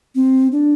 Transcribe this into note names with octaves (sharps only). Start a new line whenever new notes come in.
C4
D4